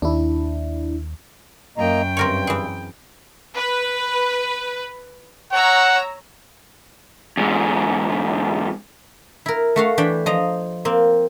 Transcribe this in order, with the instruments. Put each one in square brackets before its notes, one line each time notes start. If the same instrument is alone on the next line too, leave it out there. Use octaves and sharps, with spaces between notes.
[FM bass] D#2 [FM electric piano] D4 E4
[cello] F#2 G5 [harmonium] A#3 D#5 A#5
[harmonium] G2 [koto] C4 A#4 C#5
[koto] E3 G#4
[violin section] B4
[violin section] C#5 A#5 E6 [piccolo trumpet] F#5
[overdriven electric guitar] E2 G#2
[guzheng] E4 A#4
A3 F#4 F5
E3 D4 G5 B5
F3 D#5 A#5
A#3 C4